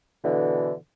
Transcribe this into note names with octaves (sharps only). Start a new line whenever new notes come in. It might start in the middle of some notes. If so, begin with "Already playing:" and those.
B2 D3 E3